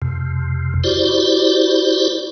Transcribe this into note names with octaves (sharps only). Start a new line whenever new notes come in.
F2 C3
E4 F#4 G4 C5 D5